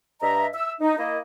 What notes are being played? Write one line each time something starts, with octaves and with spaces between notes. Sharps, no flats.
G2 D#5 E5 A#5
E5 E6
D#4
A#3 E4 D#5